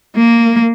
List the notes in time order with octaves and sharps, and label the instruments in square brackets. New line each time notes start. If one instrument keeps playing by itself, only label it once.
[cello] A#3